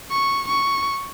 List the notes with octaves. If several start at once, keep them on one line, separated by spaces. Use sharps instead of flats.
C#6
C#6